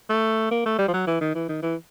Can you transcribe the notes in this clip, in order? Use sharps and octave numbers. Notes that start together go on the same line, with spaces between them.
A3
A#3
A3
G3
F3
F#3
E3
D#3
E3
D#3
E3